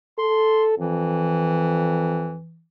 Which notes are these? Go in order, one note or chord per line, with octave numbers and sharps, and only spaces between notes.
A4 C6
F2 E3